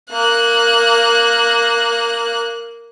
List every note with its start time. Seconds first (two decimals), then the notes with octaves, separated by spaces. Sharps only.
0.12 A#3 F#6